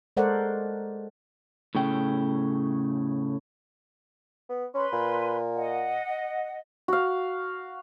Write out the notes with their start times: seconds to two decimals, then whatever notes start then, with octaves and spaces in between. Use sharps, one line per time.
0.17 G#3 A4 A#4 C5 D5 F#5
1.75 A2 C#3 G5
4.50 B3
4.74 C#4 B4 B5 C6
4.93 A#2
5.56 D#5 F#5
6.88 F#4 F5